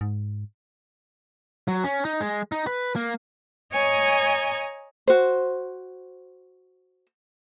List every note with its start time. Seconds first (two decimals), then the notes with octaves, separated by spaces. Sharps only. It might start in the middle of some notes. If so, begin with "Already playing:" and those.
0.01 G#2
1.68 F#3
1.84 C#4
2.05 D#4
2.21 G#3
2.52 D#4
2.67 B4
2.96 A#3
3.73 C#5 D#5 G#5 A#5
5.07 F#4 C5